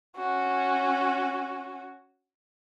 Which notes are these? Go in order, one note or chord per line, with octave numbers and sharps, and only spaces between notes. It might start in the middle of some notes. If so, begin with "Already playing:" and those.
C#4 F#4